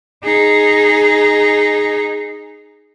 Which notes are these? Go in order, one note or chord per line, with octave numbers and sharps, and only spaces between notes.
D#4 G#4